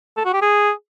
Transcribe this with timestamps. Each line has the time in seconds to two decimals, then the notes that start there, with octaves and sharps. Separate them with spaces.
0.17 A4
0.25 F#4
0.33 G4
0.42 G#4